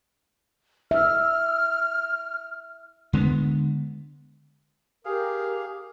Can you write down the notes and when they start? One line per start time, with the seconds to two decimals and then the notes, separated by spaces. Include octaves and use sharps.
0.91 E5 F6
3.13 D3 G#3 A#3 B3
5.05 G4 G#4 A#4 F5